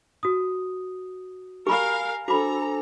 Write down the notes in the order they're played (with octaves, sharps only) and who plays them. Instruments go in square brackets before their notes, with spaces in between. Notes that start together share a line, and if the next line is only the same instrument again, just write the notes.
[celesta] F#4 D#6
[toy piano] G4 B5 [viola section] A#4 F5 [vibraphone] G#5
[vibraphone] D4 C5 G#5 [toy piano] F#4 B5 [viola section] A4 A#5